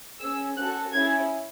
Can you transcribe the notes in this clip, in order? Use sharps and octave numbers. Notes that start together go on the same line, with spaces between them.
C#4 G#4 E6
C#4 F#4 A4 F#6
C#4 E4 G#4 G#6